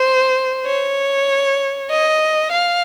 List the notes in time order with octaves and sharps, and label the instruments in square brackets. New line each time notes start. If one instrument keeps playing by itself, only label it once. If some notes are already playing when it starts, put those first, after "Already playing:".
Already playing: [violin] C5
C#5
D#5
F5